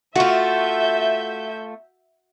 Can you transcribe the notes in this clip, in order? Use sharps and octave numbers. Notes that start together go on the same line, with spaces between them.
A3 F4 F#4 E5 G6